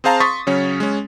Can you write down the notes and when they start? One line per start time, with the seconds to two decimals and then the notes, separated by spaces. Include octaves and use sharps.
0.04 C4 G#4 C5 F5 A5 A#5
0.20 C6 C#6 D#6 A6 B6
0.47 C#3 F#3 C#4 C#5
0.80 G#3 C#4